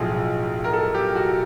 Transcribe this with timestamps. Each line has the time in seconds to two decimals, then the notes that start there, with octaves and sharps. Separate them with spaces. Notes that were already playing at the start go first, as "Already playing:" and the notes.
Already playing: B1 A2 F3 G#4
0.64 A#4
0.73 A4
0.94 G4
1.15 F#4